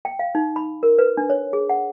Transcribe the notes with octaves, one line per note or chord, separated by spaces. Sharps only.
G5
F5
D#4
B5
A#4
B4
D4
C#5
G#4
F#5